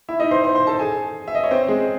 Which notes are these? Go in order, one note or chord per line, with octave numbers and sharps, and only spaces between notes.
E4 E5
D#4 D#5
C5 C6
C5 C6
C5 C6
A4 A5
G#4 G#5
E5
D#5
C#5
C4 C5
G#3 G#4